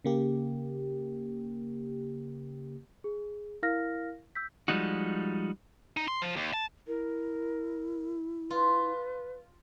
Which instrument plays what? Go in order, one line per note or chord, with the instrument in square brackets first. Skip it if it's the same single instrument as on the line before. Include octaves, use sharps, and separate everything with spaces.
[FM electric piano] C#3 A#3 G4
[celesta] G#4
E4 A#4 F5 F6 A#6
E6 G6 B6
[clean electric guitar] F3 G3 G#3 D#4 F#4
[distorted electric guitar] D#4
C6
F3
D#2
A5
[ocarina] E4 [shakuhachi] A#4
[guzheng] F4 [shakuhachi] B4